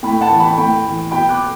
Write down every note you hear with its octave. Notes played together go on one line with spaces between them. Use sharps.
A2 G5 B5
F#5 A5
E3
G5 B5
A2 G5 B5
E3
B2 G5 B5
D6 F#6